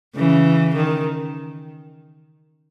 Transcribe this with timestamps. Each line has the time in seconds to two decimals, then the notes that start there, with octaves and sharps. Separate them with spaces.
0.16 C#3 E3
0.76 D#3